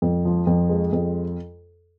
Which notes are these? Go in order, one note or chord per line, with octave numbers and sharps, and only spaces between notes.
F2
F3
F2
G#3
F2